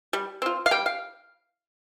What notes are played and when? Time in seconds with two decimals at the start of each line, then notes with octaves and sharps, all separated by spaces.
0.13 G3
0.42 C4 F4
0.66 F5
0.71 G3 G5
0.86 F5